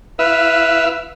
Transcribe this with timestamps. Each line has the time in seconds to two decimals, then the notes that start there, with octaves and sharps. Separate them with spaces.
0.19 E4 B4 E5 F5